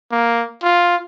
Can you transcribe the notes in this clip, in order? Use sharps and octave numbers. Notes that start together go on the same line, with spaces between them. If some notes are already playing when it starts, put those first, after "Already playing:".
A#3
F4